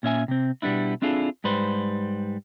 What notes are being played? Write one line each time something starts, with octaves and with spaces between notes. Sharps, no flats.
A#2 C#4 E5 G#5
C3 C4
B2 G3 B3 D4 E4
C4 D4 E4 F4 G#4 A4
G#2 G3 B4 C5